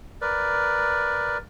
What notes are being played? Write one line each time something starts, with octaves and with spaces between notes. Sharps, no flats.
A#4 B4 D5